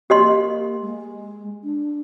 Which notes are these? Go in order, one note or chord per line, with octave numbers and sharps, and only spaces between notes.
A#3 G4 D#5 C6
G#3
D4